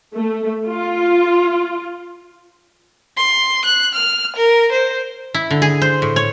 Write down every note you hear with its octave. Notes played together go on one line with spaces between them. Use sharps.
A3
F4
C6
F#6
F6
A#4
C5
E4
D3
G#4
C5
A2
C#5